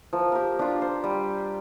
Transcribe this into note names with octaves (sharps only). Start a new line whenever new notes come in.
F3 A#4
G4 A#4
D4 F4 G4
C5
G3